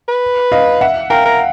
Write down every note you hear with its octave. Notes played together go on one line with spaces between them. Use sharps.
B4
D#5 F5
E5 F#5
A#4 F5 G5
A#4